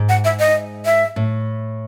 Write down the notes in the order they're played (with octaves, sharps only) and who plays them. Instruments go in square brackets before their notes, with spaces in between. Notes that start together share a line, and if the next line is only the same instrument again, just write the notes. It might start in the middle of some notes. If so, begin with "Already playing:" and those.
Already playing: [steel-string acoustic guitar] G#2
[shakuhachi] F#5
E5
D#5
E5
[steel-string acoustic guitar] A2